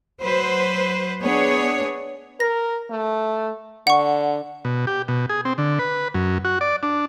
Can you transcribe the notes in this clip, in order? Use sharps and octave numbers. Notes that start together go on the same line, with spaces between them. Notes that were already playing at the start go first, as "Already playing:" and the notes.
F#3 B4 C5
B3 D4 G#4 C#5
A#4 A#6
A3
D3 F#5 C#6
B2
G4
B2
G#4
C4
D3
B4
F#2
F#4
D5
D4